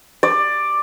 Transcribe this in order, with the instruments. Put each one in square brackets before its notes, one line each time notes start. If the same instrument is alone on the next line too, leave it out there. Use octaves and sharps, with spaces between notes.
[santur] D5